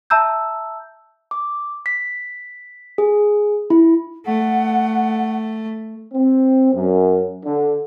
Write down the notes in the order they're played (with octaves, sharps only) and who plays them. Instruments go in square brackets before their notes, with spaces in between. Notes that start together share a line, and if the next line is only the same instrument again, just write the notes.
[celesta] E5 A5 A#5 E6 G6
[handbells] D6
B6
G#4
E4
[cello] A3 [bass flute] F#5
[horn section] C4
F#2
D3